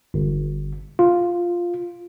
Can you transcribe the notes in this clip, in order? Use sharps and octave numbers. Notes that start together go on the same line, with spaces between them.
G1
F4